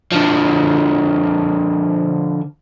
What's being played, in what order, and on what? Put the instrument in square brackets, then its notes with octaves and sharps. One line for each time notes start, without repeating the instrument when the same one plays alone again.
[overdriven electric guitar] D3 F3